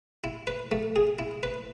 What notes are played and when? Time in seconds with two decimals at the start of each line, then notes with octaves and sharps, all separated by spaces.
0.24 E4
0.47 B4
0.72 A3
0.96 G#4
1.19 E4
1.43 B4